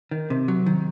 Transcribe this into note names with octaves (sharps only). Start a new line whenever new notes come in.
D#3
C3
F#3
D#3